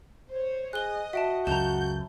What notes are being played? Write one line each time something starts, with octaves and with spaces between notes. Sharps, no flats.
C5 C#5
G#4 D#5 F#6 G7
F#4 E5 G5 A5
C#2 F#2 A5 A#5 G6